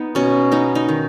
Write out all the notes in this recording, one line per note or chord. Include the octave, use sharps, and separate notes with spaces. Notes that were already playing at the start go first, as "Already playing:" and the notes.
Already playing: B3 D#4
B2 C#4
B3 D#4
D#4
D#3